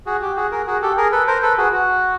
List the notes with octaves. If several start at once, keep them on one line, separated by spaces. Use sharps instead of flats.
F#4 G#4
G4
F#4 G#4
G#4 A#4
F#4 G#4
G4 A4
G#4 A#4
A4 B4
A#4 C5
A4 B4
F#4 G#4
F#4